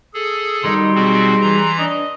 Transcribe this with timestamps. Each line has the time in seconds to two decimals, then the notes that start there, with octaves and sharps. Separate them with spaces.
0.14 G#4 A4
0.64 D#3 F#3 G3 D#4 C6
0.95 B2 C4 F#4 G#4
1.42 E3 A#5
1.79 D4 D#5